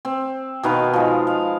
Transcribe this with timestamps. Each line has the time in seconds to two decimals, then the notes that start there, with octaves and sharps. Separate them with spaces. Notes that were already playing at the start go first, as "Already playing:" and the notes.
0.05 C4
0.63 B2 D#3 B4 F5
0.93 F3 G#3
1.27 F5